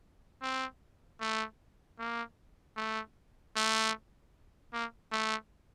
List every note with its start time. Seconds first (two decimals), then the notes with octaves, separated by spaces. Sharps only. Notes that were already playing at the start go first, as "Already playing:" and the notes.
0.42 C4
1.20 A3
1.99 A#3
2.77 A3
3.56 A3
4.73 A#3
5.12 A3